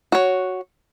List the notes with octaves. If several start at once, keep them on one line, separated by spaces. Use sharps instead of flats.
F#4 C#5